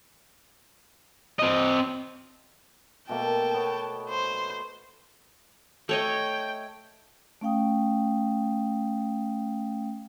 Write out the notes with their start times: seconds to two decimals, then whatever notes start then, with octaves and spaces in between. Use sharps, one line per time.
1.39 C4 D#5
3.09 B2 A3 A#3 G5 A5
3.54 B3 C#5
4.10 C5
5.89 A3 C#5 D#5 G5
7.41 A3 C#4 F5 G5 D#6